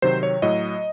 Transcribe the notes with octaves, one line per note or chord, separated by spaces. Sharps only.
C3 D#3 F#3 C5
C#5
A2 F#3 D#5